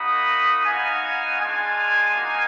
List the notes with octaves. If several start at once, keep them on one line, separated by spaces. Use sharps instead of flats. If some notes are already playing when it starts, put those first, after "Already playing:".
Already playing: A#3 D#4 F#4 B5 D#6
B3 D#4 F#4 F5 G#5
G#3 D4 F4 F5 G#5
A#3 D#4 F#4